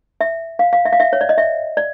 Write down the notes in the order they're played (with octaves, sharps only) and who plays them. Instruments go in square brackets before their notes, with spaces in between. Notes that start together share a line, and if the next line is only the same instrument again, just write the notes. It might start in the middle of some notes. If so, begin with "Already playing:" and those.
[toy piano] E5
F5
F5
E5
F5
E5
C#5
D5
D#5
E5
D5